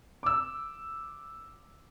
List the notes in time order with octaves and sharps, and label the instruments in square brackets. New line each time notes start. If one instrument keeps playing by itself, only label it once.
[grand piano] D6 E6